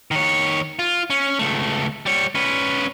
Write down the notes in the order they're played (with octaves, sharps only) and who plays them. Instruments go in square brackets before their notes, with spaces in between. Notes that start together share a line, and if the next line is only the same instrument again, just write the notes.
[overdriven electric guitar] D#3 C#5
F4
C#4
C#2 A3
G3 C#5
C#4 B4